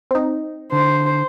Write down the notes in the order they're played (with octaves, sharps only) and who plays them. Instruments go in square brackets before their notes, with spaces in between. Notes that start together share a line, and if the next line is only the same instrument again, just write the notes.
[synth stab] C4 D#4
[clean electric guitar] D3 [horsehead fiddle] C5